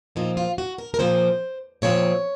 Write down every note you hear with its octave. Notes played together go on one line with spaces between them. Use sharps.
A#2 F3 C4 D#4
F4
F#4
A#4
A#4
A#2 F3 C4 C5
A#2 F3 C4 C#5